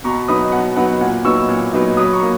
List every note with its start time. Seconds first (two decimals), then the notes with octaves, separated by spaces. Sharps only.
0.04 B2 A#5 C#6
0.28 F#3 B3 D#4 B5 D#6
0.52 B2 F#5
0.76 F#3 B3 D#4 F#5
1.01 A#2 F#5
1.25 F#3 B3 D#4 C#6 E6
1.49 A#2
1.73 F#3 B3 D#4
1.97 F#3 B5 D#6
2.13 A#5 C#6
2.22 A#3